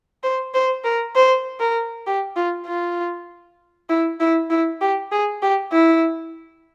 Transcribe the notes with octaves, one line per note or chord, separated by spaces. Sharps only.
C5
C5
A#4
C5
A#4
G4
F4
F4
E4
E4
E4
G4
G#4
G4
E4